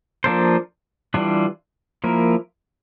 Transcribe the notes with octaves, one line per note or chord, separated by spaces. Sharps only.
F3 A#3 D4 A4 C5
E3 G3 D4 F4
F3 A#3 E4 A#4